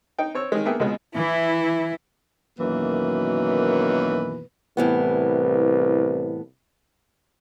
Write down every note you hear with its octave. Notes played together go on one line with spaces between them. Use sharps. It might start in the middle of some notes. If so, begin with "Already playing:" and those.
D#4 G5
C4 C#5 E6
D#3 G#3
A#3 B3 G#4 E5 G5
C#2 B2 G#3 B3
E3 E4
F#2 B2 D#3 E3 A#3 B4
C2 A2 E3 B3